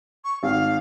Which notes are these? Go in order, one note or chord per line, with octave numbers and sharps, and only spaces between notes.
C#6
G#1 F5